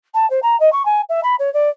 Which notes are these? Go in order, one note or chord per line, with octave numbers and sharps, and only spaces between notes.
A5
C5
A#5
D#5
C#6
G#5
E5
B5
C#5
D5